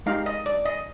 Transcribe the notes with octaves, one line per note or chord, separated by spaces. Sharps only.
G#3 D#4 G4 F5
D#5
D5
D#5